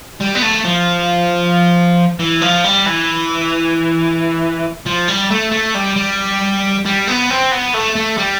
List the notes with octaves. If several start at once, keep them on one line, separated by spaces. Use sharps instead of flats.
G3
B3
A3
F3
E3
F3
G3
E3
F3
G3
A3
A3
G3
G3
G3
B3
C4
B3
A3
A3
G3